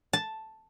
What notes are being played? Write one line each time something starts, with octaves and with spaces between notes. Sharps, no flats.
A5